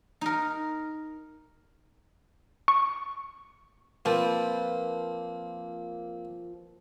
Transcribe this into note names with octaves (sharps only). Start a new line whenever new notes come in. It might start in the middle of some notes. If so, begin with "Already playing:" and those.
D#4 A#4
C#6
F3 A#3 C4 B4